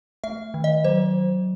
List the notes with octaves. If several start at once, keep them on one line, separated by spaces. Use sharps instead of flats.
A3 E5
D#3
D#5
F#3 C5